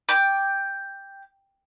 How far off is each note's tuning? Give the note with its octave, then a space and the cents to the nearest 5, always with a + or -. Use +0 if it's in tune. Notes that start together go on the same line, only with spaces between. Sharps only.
G5 +5 D6 +0